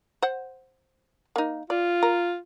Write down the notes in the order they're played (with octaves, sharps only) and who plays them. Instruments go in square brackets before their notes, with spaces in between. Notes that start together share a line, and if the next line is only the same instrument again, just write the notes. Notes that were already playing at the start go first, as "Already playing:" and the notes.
[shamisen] C5 F#5
A#3 D#4
[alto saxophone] F4 [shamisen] D5
[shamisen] A#4